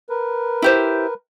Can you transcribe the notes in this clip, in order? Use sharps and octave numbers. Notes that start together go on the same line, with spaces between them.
A#4 B4
E4 G4 C5